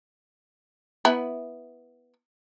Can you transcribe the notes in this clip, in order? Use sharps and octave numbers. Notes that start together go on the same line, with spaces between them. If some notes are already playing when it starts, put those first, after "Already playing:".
B3 E4